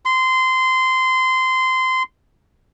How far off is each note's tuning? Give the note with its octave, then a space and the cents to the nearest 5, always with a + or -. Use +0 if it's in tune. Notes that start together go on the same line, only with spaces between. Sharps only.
C6 -15